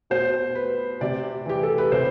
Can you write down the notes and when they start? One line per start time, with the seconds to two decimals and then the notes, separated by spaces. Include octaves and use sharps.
0.10 B2 C5
0.55 B4
1.01 C3 D5
1.46 E3 G4
1.63 A4
1.78 B4
1.92 C3 C5